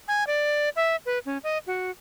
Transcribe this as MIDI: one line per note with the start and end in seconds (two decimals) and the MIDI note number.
0.08 0.24 80
0.27 0.69 74
0.76 0.96 76
1.06 1.19 71
1.26 1.38 61
1.44 1.58 75
1.67 1.91 66